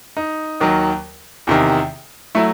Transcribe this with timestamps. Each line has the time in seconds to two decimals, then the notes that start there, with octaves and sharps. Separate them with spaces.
0.17 D#4
0.60 D#2 D#3 F#3
1.47 E2 C3 D#3
2.35 F#3 A3 E4